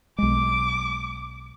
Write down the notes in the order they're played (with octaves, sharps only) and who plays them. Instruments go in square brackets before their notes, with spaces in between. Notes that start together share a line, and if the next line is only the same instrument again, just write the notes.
[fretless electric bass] B1 G#3 [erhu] D6